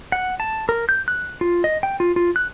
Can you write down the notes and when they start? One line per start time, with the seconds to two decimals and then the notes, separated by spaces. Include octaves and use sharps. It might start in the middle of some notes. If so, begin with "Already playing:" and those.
0.12 F#5
0.40 A5
0.69 A#4
0.89 G6
1.08 F#6
1.41 F4
1.64 D#5
1.83 G5
2.00 F4
2.16 F4
2.36 F#6